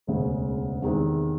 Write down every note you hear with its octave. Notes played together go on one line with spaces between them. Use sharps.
E1 D2 C#3
E2 C3 D#3 G#3 C4